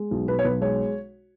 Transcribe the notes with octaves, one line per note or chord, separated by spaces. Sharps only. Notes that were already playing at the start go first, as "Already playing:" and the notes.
Already playing: G#3
B1
B2 B4
C#5
B1 B4
G#3 C#5